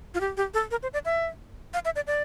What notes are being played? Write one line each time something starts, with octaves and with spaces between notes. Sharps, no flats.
F4
G4
G4
A4
A#4
C5
D5
E5
F5
E5
D5
D5